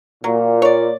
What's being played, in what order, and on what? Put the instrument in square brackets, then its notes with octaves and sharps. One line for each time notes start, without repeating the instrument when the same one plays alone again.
[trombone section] A#2 [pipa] F#3
[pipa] C#5 D5